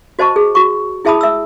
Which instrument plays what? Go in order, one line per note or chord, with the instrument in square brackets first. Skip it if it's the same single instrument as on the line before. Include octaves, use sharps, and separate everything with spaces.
[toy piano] F#4 C5 D#5 A5 C#6
G#4
F#4 C#6
E4 G#4 E5 A5 B5 D#6
E5 E6